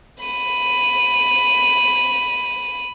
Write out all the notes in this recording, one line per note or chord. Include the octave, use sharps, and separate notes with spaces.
B5 D#7